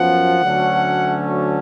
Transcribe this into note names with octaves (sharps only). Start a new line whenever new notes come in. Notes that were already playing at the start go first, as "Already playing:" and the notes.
Already playing: F#2 F3 B3 F#5
D2 D3 F#3 A3 C#4